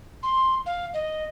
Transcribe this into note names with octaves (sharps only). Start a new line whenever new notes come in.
C6
F5
D#5